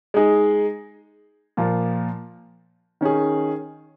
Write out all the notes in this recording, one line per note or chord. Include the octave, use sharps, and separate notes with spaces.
G#3 D#4 G#4
A#2 F3 A#3 F4
D#3 C#4 G#4